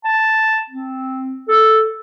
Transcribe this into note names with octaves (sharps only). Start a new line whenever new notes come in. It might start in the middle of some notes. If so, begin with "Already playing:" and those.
A5
C4
A4